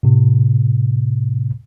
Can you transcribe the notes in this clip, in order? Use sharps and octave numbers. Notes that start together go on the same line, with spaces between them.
A2 C3